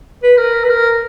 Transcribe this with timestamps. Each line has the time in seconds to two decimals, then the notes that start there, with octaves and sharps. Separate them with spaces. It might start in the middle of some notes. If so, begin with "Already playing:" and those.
0.23 B4
0.37 A#4
0.64 B4
0.70 A#4